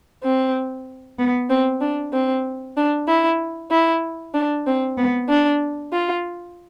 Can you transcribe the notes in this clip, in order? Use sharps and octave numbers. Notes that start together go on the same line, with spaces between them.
C4
B3
C4
D4
C4
D4
E4
E4
D4
C4
B3
D4
F4